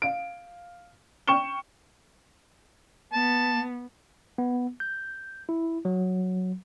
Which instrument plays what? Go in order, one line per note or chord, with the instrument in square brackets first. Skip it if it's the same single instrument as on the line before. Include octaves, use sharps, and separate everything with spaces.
[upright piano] F5 D7
G5 C#6 C#7 E7 G7
[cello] B3 [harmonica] A5
[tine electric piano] B3
G6
E4
F#3